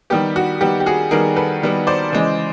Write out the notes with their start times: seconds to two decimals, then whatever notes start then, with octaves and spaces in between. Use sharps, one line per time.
0.10 D#3 G3 B3 G4
0.36 F#4
0.61 D#3 G3 B3 G4
0.80 G4
0.86 F#4 G#4
1.11 D#3 G3 B3 G#4 A#4
1.36 A4 B4
1.62 D#3 G3 B3
1.87 C5 D5
2.12 C#3 E3 G#3